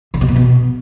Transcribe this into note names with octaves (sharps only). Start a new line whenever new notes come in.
D3
B2
A#2
B2